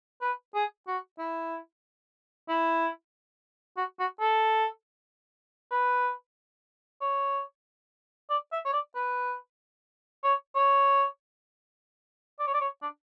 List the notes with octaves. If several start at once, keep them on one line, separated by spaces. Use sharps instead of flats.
B4
G#4
F#4
E4
E4
F#4
F#4
A4
B4
C#5
D5
E5
C#5
D5
B4
C#5
C#5
D5
C#5
D5
C#5
D4